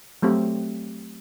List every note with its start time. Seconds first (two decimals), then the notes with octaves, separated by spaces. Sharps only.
0.22 F#3 A3 C4 G4